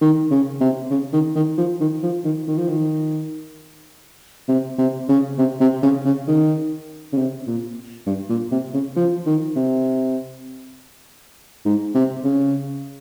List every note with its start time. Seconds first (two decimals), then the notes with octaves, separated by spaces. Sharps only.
0.01 D#3
0.31 C#3
0.61 C3
0.91 C#3
1.13 D#3
1.35 D#3
1.58 F3
1.80 D#3
2.03 F3
2.25 D#3
2.47 D#3
2.58 F3
2.69 D#3
4.48 C3
4.78 C3
5.09 C#3
5.38 C3
5.60 C3
5.83 C#3
6.05 C#3
6.28 D#3
7.13 C#3
7.17 C3
7.47 A#2
8.06 G2
8.29 A#2
8.51 C3
8.74 C#3
8.96 F3
9.26 D#3
9.56 C3
11.65 G#2
11.95 C3
12.24 C#3